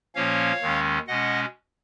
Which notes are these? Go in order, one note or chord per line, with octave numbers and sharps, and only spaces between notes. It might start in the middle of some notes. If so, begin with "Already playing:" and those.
A#2 F3 A#3 C#4 C#5 F5
D#2 D#3 G#3 C#4
B2 G#3 C#4 D#5 F#5